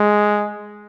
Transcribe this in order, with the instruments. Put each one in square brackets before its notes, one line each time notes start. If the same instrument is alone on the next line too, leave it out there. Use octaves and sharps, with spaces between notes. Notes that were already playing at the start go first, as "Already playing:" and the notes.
Already playing: [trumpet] G#3